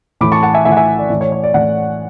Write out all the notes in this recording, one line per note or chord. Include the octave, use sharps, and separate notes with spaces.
A2 E3 B5 D6
A5 C#6
F#5 A5
E5 G#5
A2 E3 E5 F#5 G#5
E5 G#5
D5
A2 E3 D5
C#5
C#5
D5
A2 E3 D5 F#5